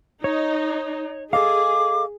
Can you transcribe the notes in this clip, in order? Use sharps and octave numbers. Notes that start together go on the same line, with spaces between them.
D#4 C#5
G#4 A4 D#5 F5 D6